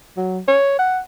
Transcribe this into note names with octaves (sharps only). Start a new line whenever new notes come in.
F#3
C#5
F#5